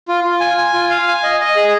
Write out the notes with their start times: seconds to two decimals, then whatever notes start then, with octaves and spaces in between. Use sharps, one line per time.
0.08 F4
0.24 F4
0.40 G#5
0.57 G#5
0.73 F4
0.90 F5
1.08 G#5
1.23 D#5
1.40 D#5
1.56 G#4